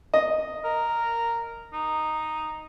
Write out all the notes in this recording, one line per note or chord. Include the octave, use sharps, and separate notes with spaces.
D#5
A#4
D#4